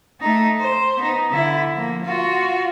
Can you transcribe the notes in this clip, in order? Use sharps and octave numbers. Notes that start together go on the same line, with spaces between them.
A3 D#4
C5
B3 D#4
D3 E4
F3 A#3
F4 F#4